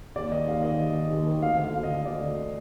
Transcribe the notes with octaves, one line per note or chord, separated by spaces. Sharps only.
D#2 D5
D#3 D#5
D#2 F5
D#3 D#5
D#2 D#5
D#3
D#2
D#3
D2 F5
D3
F5
D2
D#5
D3
D2 D5
D3